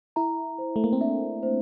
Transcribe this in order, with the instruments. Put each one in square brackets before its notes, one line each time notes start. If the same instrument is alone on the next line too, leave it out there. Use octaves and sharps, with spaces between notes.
[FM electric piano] E4 [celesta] A#5
[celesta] C5
[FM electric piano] A3
A#3
C4
[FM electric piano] D4 [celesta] E5
[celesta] C5